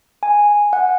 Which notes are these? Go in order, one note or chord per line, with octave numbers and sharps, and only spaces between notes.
G#5
F#5